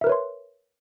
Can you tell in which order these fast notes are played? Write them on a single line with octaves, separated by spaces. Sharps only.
E5 A#4 B4 C#5 C6